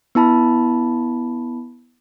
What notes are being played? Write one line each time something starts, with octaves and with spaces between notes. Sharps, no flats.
B3 E4 A5 B5